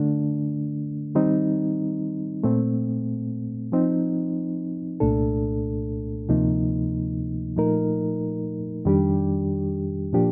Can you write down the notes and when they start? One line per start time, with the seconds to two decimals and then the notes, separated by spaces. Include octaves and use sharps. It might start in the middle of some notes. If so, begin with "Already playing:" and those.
Already playing: D3 A3 D4
1.15 D#3 G3 C4 D#4
2.44 A#2 A3 C4
3.72 F3 C4 D#4
5.00 C2 A#2 A3 D4 A4
6.29 D2 C3 F3 A#3 D#4
7.57 A#2 F3 A3 D#4 A#4
8.85 F2 D#3 G3 D4 G4
10.13 A#2 F3 A#3 D4 G4